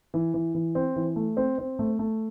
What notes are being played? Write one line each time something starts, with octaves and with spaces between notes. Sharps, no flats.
E3
E3
E3
C4
E3
A3
C4
C4
A3
A3